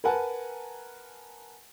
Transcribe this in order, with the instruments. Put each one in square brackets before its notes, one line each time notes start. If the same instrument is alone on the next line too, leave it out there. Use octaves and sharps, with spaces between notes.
[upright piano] A#4 B4 F#5 G#5 A5